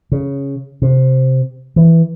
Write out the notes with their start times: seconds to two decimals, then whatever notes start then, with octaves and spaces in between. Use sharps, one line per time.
0.12 C#3
0.82 C3
1.76 E3